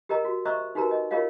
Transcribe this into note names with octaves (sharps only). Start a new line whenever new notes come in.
G4 A#4 D#5 A#5
F#4
C5 D#5 E5 A#5 C#6 E6
D#4 F#4 G4 A#4 B4 A#5
D#5
F4 G4 A#4 C#5 D#5 F5